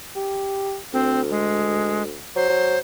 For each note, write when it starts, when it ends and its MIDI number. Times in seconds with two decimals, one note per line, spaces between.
0.16 0.77 67
0.93 2.20 38
0.93 1.20 60
1.30 2.02 56
2.36 2.46 54
2.36 2.79 72
2.49 2.77 54